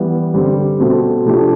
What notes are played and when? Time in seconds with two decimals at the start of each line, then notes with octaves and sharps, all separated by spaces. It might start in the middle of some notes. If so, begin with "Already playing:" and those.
Already playing: E3 G3 B3
0.34 G2 D3 G3 C4 G4
0.80 B2 A3 C4
1.25 C3 F3 A3 D4 G4